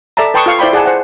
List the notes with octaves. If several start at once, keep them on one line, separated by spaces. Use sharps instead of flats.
A4 D5 E5 A5 A#5
B4 G5 A5 C6 C#6 D#6
F4 A4 F5 C#6
E4 C5 D5 G5 B5 C6
G#4 D5 F#5 G#5 A5
C5 F#5